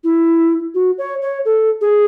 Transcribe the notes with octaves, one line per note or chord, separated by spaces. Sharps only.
E4
F#4
C#5
C#5
A4
G#4